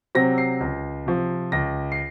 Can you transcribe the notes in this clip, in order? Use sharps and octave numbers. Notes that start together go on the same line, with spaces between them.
C3 F#3 C4 A#6
C7
C#2
C3 F3
C#2 A#6
C7